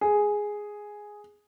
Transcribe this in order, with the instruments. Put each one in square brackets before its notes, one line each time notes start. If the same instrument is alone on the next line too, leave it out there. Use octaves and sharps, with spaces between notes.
[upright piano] G#4